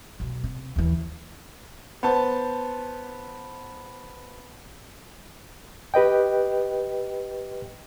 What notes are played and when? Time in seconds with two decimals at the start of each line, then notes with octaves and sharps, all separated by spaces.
0.20 B1
0.44 C3
0.76 D#2 E3
2.03 B3 C5 A5
5.94 G4 B4 D#5 G5